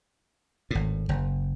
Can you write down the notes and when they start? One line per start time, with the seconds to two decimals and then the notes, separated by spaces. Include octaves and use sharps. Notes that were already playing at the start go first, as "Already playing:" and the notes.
0.71 G#1 A2
1.09 F#1